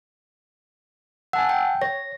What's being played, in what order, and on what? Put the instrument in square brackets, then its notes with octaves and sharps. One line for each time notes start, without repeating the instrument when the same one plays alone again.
[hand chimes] F#5 [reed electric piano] G#5 A5 E6
[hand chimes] G5
[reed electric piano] C#5 [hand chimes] A#6